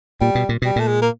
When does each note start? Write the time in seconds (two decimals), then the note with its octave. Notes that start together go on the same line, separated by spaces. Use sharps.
0.21 A#2 G3
0.35 B2
0.49 A#2
0.62 B2 G3
0.76 A#2 A3
0.87 G#3
1.02 A#3